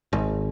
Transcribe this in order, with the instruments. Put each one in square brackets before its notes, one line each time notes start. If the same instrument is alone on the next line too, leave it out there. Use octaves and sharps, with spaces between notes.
[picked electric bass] G#1